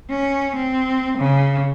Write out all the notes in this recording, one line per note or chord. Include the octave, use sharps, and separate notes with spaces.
C#4
C4
C#3